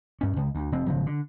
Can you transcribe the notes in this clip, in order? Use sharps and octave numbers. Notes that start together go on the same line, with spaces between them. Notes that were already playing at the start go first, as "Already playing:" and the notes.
G2 C#4
C#2
D2
F1 F3 C4
G#1 C#3 F3 F#3
D3